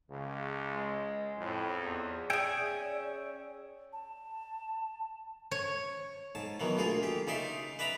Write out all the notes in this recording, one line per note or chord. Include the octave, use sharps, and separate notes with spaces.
C#2 C#3
G#3
F2 A2
E2
C#4 G#4 D5 E5 G5 G#5
A5
C#5
G#2 A5
B2 D#3 E3 F#3
D2 A#3 F4 G#4
G4
C#3 D#4 D5 E5 C6
B4 D5 E5 A#5 B5